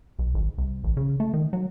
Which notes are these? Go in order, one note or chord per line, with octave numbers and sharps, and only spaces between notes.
B1
G#1
C2
A1
C#3
A3
D#3
F#3